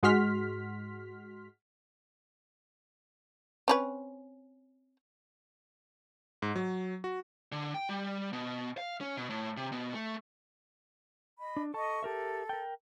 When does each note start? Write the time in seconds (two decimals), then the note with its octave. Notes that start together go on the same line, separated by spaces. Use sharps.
0.03 G#2 G#3 F#4 C6 F6 B6
3.68 C4 C#4 B4
6.42 G#2
6.56 F#3
7.04 F#4
7.52 D3
7.75 G5
7.89 G3
8.33 B2
8.78 F5
9.01 C#4
9.17 B2
9.30 A2
9.57 C3
9.72 B2
9.94 A3
11.39 D#5 B5
11.57 D4
11.74 A4 D#5 A5 C#6
12.03 G4 A4 A#4 E5
12.49 A#4 G5